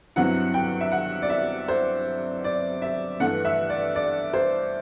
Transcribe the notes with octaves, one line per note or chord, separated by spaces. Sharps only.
G2 F#3 C4 E4 F#5
G5
E5
F#5
D5
E5
C5
D5
E5
G2 E3 A3 F#5
E5
D5
D5
C5